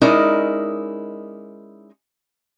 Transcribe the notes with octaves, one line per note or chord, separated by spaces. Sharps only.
G#3 C#4 D#4 E4 A#4 D5